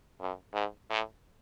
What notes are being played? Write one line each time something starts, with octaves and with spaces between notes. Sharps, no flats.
F#2
G#2
A2